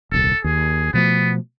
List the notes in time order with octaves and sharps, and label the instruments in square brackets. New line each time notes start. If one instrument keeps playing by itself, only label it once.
[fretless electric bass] D#1 C2 [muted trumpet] A4
[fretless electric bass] D#2 [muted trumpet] G#4
[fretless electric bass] B2 F3 A3 [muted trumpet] B3